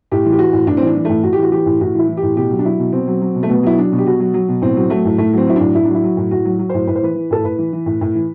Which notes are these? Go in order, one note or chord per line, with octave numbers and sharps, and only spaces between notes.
A2 G4
E3
G4
E3 F#4
A2
A2 D4
C4
E3 D4
E3
A2 A3
A2 F#4
G4
E3 F#4
E3 G4
A2
A2 F#4
E3
E4
E3
G4
A2
B2 G4
F#3
D4
F#3 E4
B2
B2 C4
F#3
F#3
B2
A3
B2 B3
F#3 E4
F#3 D4
B2
G4
B2 F#4
F#3
F#3
B2
A2 C4
F#3
F#3 A3
A2
A2 A3
F#3 C4
F#3 E4
A2 D4
A2 E4
F#3 D4
E4
F#3
A2
A2 F#4
F#3
F#3
A2 C5
A2 B4
C5
E3 B4
E3
A2 A4
A2 B4
E3
E3
A2
A2
E3